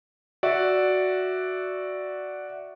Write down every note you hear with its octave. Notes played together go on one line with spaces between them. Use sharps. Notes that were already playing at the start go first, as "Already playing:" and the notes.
F#4 D5 E5